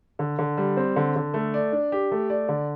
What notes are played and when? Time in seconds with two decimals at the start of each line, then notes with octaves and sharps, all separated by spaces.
0.19 D3
0.39 D3
0.57 G3
0.77 C4
0.96 D3
1.16 D3
1.34 A3
1.54 D5
1.72 D4
1.92 G4
2.11 A3
2.30 D5
2.49 D3